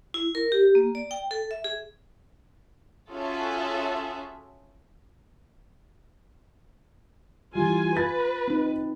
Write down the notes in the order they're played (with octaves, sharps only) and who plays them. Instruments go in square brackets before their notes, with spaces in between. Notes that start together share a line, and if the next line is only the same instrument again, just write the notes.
[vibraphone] E4
A#4
G4
A#3
D5
G5
A4
E5
G#4
[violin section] C#4 F4 F#4 G#4 A4 E5
[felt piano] E3 G3 [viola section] F4 G#5
[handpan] F4 [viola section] B4 [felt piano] A6
[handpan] C4 D#4